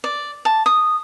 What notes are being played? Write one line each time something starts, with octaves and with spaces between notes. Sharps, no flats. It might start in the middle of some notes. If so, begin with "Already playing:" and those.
D5
A5
D#6